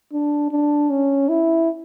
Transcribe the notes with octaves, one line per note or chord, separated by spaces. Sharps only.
D4
D4
C#4
E4